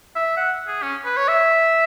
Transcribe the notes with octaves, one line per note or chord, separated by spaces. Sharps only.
E5
F#5
G#4
C#4
B4
C#5
E5